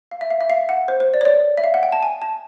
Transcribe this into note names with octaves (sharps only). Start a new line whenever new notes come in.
F5
E5
F5
E5
F5
F#5
C5
C5
D5
C#5
D5
E5
F5
F#5
G5
A5
G#5
A5